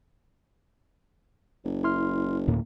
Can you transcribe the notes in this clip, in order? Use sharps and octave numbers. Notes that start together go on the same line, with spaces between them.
F#1
E4 C6 F6
D2 A2 A#3